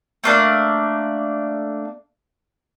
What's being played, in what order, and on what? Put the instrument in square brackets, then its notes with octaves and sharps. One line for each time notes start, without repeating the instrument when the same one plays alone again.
[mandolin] A3 A#3 D4